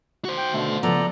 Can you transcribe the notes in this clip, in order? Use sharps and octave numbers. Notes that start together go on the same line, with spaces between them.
F#4 C5
G5
B2 D3 A3
C#3 F3 B3 A4 D5 A#5